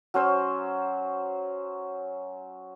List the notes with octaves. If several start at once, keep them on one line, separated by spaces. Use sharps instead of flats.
F#3 C#4 C5 E6